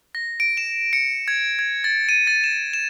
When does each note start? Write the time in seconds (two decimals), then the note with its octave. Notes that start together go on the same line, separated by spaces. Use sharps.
0.15 A#6
0.40 D7
0.57 E7
0.93 C#7
1.28 G#6
1.59 G#6
1.84 A6
2.09 D#7
2.27 A6
2.44 E7
2.73 E7